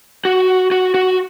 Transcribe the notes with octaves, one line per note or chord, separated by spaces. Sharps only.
F#4
F#4
F#4